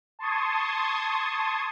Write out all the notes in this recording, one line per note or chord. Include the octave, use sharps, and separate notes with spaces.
A5 C6 C#6 D#6 G#6